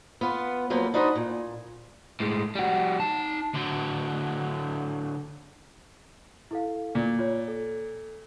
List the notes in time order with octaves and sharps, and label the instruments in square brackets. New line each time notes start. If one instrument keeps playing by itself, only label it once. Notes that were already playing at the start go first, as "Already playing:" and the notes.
[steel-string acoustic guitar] B3 F4 B4
F2 F#3 A#3 B3 C5
D4 D#4 F#4 B4 C5 D#5
A#2
[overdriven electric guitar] A2 G#3
G3 F#4
D#4 A5
D3 F#3
[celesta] E4 A4 F5
[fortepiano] A#2
[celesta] F4 C#5
A4